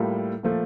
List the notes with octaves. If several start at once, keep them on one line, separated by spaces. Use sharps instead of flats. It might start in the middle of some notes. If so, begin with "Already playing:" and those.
Already playing: A2 G3 A#3 F4 A4
A#2 F3 A3